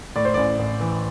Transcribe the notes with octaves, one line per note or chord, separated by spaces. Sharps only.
A2 D5
C5
A1 D5
A1
E3